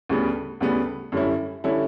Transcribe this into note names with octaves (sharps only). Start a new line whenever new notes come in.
D2 C#3 G3 B3
D2 C#3 G3 B3
F#2 D3 G3 C#4 E4
D3 G3 C#4 E4